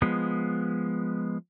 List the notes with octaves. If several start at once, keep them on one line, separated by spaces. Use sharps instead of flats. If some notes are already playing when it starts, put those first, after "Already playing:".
F3 G#3 B3